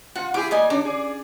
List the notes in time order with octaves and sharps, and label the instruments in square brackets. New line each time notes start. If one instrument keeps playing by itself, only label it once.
[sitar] F4 [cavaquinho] F#5
[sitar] E4 G4 G#4 [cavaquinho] D6
[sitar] A#3 [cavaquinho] D5 D#5 G#5
[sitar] C#4 D4 [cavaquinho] D5
[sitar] G#4